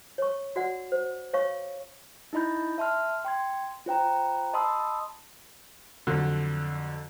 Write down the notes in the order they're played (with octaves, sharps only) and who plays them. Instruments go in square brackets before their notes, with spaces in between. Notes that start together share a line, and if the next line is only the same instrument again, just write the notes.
[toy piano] C#5 C#6
F#4 D5 F#5
C5
C#5 F5 C#6
[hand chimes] D#4 E4 D#5 B5 G6
E5 A5 C6 F6
G5 C6 G#6
F4 C5 G5 A#5
D#5 A5 B5 C6 D#6 E6
[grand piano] F2 D3 F#3